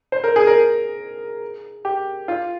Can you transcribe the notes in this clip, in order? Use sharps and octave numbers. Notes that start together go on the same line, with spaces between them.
C5
A#4
G#4
A#4
G4
F4